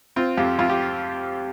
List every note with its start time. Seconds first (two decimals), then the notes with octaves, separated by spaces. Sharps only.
0.16 C4 F4
0.37 F2 G4
0.59 F2 F4
0.70 G4